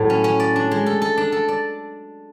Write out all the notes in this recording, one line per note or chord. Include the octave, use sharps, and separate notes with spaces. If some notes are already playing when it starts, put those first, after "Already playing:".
Already playing: A2 F#3
C#4
C#4
D5
D4
G#3
A4
A4
D4
A4
D5